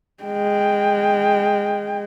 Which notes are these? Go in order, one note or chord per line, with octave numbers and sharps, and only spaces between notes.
G#3 G5